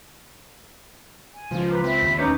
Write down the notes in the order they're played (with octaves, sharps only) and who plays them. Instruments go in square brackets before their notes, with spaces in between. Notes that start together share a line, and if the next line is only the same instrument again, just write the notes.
[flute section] G#5
[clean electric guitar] C#2 F4 [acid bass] F3
[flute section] B4 A#5 D6
[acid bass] C4 [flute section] E5 B5
[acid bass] D#2
[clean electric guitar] C#4 B4 C#5 [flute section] D#4 D6 G6